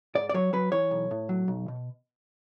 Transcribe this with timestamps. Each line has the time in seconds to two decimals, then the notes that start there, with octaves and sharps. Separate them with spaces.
0.15 G#2 D5
0.29 D5
0.34 F#3 C#5
0.53 F#3 B4
0.72 E3 C#5
0.91 B1
1.11 A2
1.29 F#3
1.48 B1
1.68 B2